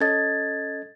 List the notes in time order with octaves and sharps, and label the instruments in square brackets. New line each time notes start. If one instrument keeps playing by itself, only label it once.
[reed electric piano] C#4 A4 D#5 [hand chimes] G#6 A6